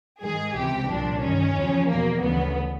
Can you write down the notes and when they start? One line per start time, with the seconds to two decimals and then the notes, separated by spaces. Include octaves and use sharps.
0.22 G#2 D#3 G#4
0.56 C#2 C3 E3 G4
0.89 C2 A#2 F3 D4
1.22 G2 D#3 C#4
1.56 E2 C#3 F3
1.89 E2 B2 A#3
2.22 D2 C#3 E3 B3